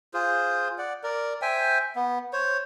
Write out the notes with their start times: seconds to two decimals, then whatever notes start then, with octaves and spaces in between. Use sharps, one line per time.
0.14 F4 G#4 C5
0.78 D5 F#5
1.03 A#4 D5
1.42 C5 E5 G5 G#5
1.96 B3
2.33 C5 C#5